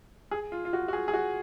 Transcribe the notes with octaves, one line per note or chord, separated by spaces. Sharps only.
G#4
F4
F4
F#4
F#4
G#4
G#4
F#4